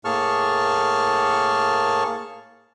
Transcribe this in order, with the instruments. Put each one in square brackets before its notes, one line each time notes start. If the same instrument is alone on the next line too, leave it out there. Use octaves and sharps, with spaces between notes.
[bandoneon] A2 A#3 G#4 A5 C#6 F6